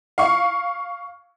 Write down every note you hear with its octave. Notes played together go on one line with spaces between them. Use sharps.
F5 C#6